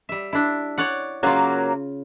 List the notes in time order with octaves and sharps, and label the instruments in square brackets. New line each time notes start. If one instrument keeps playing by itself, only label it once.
[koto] G3 E5
D4 E4
C#5 D5 F#5
[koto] C#3 F4 [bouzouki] F#3 A#3